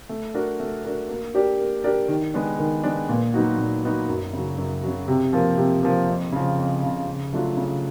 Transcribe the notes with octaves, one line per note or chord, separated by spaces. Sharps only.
A3
D4 F#4 A#4
A3
D4 F#4 A#4
A#3
D4 G4 A#4 D5
A#3
D4 G4 A#4 D5
D#3
G#3 B3 D4
D#3
G#3 B3 D4
A#2
F#3 B3 D#4 F#4
A#2
F#3 B3 D#4 F#4
F#2
C#3 F#3
F#2
C#3 F#3
C3
F3 A#3
C3
F3 A#3
F2
C#3 F3
F2
C#3 F3
C#3
F#3 A3 D4 F4
C#3